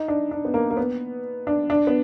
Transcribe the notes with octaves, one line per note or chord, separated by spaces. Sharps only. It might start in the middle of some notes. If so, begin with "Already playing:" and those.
Already playing: D#4
D4
D4
B3
A#3
A#3
B3
D4
D4
B3